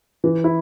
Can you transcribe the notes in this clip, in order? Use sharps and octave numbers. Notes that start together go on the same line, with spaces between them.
E3
E4